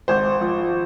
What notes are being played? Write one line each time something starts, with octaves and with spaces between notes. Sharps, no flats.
G#1 C5
F3